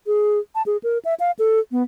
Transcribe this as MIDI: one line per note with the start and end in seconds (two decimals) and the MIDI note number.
0.07 0.39 68
0.55 0.62 81
0.66 0.77 68
0.83 0.98 70
1.05 1.14 76
1.20 1.31 77
1.39 1.60 69
1.71 1.83 59